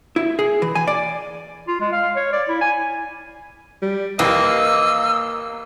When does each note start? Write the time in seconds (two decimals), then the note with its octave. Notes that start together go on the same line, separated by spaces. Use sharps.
0.16 E4
0.39 G#4
0.62 E3
0.75 G#5
0.87 D5
1.68 F4
1.81 G#3
1.92 F5
2.16 C#5
2.32 D5
2.49 E4
2.61 G#5
3.82 G3
4.19 A#1 D#2 E3 A#3 D#5 E6